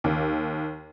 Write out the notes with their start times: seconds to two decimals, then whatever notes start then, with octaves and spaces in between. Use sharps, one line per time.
0.04 D#2